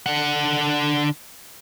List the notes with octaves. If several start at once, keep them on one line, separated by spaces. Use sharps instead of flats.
D3 F#5